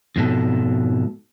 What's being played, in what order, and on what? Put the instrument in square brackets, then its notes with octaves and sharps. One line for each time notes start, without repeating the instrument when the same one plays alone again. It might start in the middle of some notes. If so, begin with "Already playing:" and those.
[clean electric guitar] F2 G#2 B2 A4